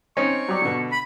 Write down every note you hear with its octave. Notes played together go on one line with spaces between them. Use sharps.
C4 C#4 D#4 C#6
F#3 G4 D5
B2 D3
B5